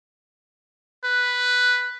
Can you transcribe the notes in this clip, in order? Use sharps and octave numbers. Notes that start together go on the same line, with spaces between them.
B4